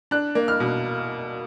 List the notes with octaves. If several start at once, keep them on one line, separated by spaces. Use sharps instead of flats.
D4 F#6
A#3
F6
B2